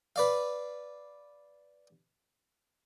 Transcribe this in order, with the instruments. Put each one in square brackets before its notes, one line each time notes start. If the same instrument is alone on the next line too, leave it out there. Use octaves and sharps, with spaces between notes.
[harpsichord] B4 D5 F5